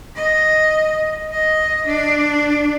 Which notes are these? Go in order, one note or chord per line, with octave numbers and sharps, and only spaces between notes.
D#5
D#5
D4